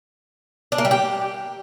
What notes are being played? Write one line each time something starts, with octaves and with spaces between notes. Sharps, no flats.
D4
A#3
G3
G4